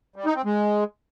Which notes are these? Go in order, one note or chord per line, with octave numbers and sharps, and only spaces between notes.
G3
D#4
C4
G#3